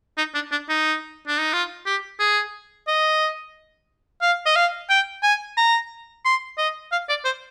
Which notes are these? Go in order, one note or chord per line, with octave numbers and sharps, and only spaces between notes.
D#4
D4
D4
D#4
D4
D#4
F4
G4
G#4
D#5
F5
D#5
F5
G5
G#5
A#5
C6
D#5
F5
D5
C5